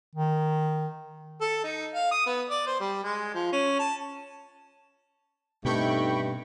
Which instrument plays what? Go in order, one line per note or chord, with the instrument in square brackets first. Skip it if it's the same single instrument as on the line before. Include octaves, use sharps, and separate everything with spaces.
[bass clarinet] D#3
[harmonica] A4
D#4
F5
D#6
B3
D5
C5
G3
G#3
F3
C#4
A5
[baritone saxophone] G2 [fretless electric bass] B2 C4 [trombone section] A3 D#4 [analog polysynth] G5 B5 C#6